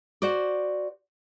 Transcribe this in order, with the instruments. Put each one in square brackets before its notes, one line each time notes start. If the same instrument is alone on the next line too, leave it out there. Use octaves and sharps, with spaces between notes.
[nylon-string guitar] F#4 C5 D5